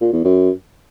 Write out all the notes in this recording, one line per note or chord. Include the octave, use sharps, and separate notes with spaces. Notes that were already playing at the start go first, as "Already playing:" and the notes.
A#2
E2
F#2